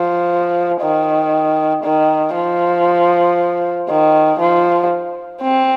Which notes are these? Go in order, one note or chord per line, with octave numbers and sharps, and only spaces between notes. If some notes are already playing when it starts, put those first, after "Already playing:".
Already playing: F3
D#3
D#3
F3
D#3
F3
C4